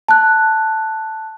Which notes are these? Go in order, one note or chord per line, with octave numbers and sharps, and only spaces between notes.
A5 F#6